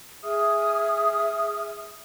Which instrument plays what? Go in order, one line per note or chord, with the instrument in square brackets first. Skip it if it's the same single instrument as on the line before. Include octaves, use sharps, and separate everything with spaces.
[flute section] G#4 E5 D#6 F6